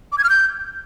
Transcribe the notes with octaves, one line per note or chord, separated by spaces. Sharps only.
D6
G#6
F6
G6